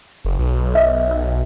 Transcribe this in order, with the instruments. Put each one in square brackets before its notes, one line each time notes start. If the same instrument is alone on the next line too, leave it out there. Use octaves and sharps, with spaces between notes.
[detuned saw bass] F#1
B1
[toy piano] D#5 E5
E6